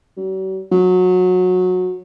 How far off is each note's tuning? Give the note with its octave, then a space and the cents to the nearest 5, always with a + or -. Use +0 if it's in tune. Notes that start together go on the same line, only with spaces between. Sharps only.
F#3 +45
F#3 -20